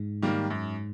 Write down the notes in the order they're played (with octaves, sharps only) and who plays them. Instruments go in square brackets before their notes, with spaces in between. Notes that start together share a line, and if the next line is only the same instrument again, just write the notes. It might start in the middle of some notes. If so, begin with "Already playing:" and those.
Already playing: [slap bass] G#2
[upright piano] D#3 G3 A#3
F#2